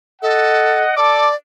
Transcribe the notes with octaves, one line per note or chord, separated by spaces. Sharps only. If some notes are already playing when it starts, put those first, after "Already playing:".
A4 D#5 F#5
A4 D5 D6